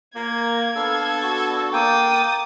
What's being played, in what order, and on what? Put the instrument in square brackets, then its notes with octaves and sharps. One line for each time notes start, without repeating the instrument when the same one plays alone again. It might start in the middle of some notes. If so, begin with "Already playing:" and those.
[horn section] A#3 [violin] G#6
[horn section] B3 D4 A4 [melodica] F5
[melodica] F#4
[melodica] A#3 G5 [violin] D#6 A6